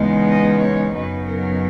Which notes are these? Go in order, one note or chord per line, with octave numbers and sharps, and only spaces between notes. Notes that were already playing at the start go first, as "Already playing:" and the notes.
Already playing: E2 C#3 G#3 B3 D#4
D#5
C#5
F#2 C#3 F#3 B3 D#4 B4
A#4